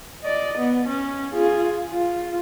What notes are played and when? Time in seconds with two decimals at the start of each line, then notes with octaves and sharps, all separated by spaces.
0.23 D5 D#5
0.58 B3
0.88 C#4
1.34 F4 G#4
1.90 F4